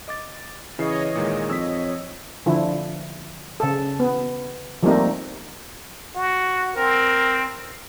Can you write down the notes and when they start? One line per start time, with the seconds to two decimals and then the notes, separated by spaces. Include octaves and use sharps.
0.08 D#5 D6 A6
0.79 C#3 E3 C#5 D#5 C7
1.15 A#2 D#3 G#3
1.50 F2 E6 B6
2.46 D3 F3 E4
3.60 C#3 A4
4.00 B3
4.83 F3 G3 A3 A#3 C4 D#4
6.16 F#4
6.76 C4 A#4